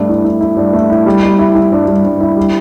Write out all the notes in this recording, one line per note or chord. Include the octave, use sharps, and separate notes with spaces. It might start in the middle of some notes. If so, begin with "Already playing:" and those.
Already playing: G2 A3
E4
E4
E4
G2
A3
E4
G3
G3
E4
E4
G2
G2
G2
E4
G3